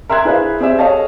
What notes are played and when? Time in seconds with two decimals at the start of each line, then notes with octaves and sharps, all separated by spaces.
0.09 A#4 E5 C6 F#6 G#6
0.25 E4 G#4 B4 C5 E5 F5
0.60 C4 G4 G#4 D5 E5
0.79 G#4 A4 C#5 D#5 F5 A5